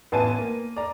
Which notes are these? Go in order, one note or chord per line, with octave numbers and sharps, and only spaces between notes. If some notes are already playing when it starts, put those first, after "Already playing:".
A1 B3 B4 G#5 A5 D#7
A#3
D5 A#5